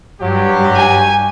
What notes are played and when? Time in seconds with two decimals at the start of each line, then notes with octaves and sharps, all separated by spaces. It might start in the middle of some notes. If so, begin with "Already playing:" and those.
0.21 G2 F#3 G4
0.75 G#5